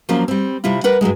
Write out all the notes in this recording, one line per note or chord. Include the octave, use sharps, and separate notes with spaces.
F3 F#3 A#3 C#4 F4
G3 C4
C3 G3 E4 F4
A#4 B4 F#5
G2 F3 F#3 G#3